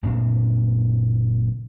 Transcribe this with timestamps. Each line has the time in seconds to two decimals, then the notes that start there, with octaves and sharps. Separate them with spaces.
0.03 F#1 A#2 C4 D4